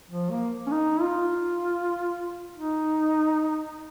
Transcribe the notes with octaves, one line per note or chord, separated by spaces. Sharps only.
F3
A#3
C#4
D#4
F4
D#4